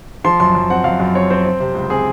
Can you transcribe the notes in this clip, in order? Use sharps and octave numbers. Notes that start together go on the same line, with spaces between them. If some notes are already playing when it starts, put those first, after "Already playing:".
F3 C6
F#2 C6
F#2
C4 F#5
F#2 F5
F#2
C4 C#5
C4 C5
C4
C3
C#2
C4 G#4